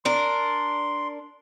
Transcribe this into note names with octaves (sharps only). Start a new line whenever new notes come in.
D4 A#4 C6